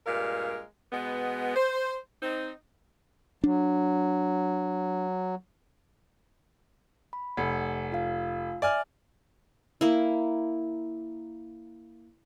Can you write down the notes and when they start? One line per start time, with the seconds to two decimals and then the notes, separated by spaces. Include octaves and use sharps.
0.06 G2 A#2 G#3 A#4 F5
0.92 B2 G#3 B3
1.56 C5
2.21 C4 D#4
3.44 F#3 D4
7.13 B5
7.37 F1 F#5 C#7
7.92 F4 F5
8.62 D5 E5 G#5 F6
9.81 A#3 E4